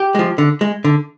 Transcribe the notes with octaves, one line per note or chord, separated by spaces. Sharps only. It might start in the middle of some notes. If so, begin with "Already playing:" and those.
Already playing: G4
F3 G#3
D3
G#3
D3